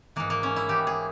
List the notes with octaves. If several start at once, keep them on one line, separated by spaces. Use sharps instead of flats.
G#2 E3 A#3
A#3
C#4
E4
G#2 E3 G4
G#4